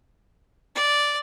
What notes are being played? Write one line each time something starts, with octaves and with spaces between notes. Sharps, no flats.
D5